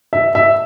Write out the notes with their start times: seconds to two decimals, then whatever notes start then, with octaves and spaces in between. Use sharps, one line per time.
0.13 E5
0.35 E5